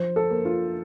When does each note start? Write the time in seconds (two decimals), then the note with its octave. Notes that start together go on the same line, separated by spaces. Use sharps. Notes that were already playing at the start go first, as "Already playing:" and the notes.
Already playing: F3 C5
0.16 A4
0.30 A#3
0.45 F4